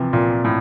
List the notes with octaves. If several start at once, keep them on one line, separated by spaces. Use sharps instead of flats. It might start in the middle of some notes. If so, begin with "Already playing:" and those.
Already playing: C3 E3 F3
A#2
A2